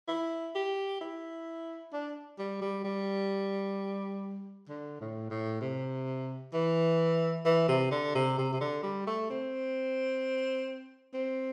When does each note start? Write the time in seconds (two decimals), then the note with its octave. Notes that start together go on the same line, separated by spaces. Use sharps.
0.08 E4
0.55 G4
1.01 E4
1.93 D4
2.38 G3
2.62 G3
2.84 G3
4.69 D3
5.01 A2
5.30 A2
5.61 C3
6.54 E3
7.45 E3
7.68 C3
7.91 D3
8.15 C3
8.38 C3
8.53 C3
8.61 D3
8.83 G3
9.07 A3
9.30 C4
11.14 C4